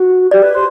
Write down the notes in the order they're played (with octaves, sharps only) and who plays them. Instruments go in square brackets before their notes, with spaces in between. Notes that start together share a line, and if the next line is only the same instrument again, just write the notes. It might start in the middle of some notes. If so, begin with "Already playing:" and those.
Already playing: [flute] F#4
[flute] G4 [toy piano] D5
[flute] B4
C5